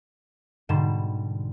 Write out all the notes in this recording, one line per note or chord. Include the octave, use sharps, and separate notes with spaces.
G#2 B2 D3 G3 C6 E7